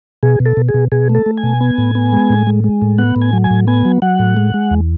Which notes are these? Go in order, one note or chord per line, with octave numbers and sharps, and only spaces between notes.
B2 G#4
B2
A4
B2
G#4
B2
B2 G#4
A3
A4
A3
G#5
B2
B3
A2
B3
G#3
A2
G#3
G#3
A2
B3 F#5
A2
G#5
F#3
G#5
A2
B3 G#5
F#3
F#3 F#5
A2
G#3
G#3
E2